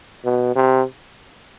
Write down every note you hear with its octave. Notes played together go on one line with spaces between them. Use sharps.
B2
C3